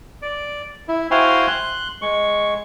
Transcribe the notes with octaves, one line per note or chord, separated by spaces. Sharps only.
D5
E4
E4 F#4 C5 F5 G5 G#5
C6 F#6
G#3 C#6